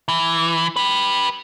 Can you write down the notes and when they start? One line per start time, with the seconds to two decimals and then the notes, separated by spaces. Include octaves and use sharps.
0.08 E3
0.76 G4 B4